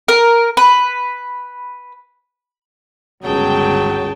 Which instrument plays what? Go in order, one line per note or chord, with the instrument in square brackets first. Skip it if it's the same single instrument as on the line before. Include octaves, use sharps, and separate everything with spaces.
[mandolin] A#4
B4
[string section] G1 C#2 G5 [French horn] F#3 [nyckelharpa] G#4 A5